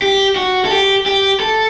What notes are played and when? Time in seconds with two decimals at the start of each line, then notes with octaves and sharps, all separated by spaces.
0.02 G4
0.36 F#4
0.65 A4
0.71 G4
1.06 G4
1.40 A4